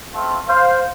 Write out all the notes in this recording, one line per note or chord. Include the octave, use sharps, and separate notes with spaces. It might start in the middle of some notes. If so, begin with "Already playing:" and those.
A3 C4 F4
C5 F5